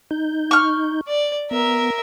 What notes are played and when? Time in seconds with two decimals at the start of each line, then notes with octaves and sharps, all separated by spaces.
0.11 D#4 G6
0.51 C#6 F6
1.08 D5
1.51 B3 A#4 E5